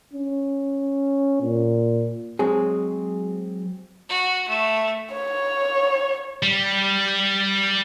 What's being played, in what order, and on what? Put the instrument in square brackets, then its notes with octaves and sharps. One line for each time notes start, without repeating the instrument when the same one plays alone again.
[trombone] C#4
A#2
[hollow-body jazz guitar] F#3 G#3 C4 G#4
[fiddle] F#4
A3
[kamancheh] C#5
[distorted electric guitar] G3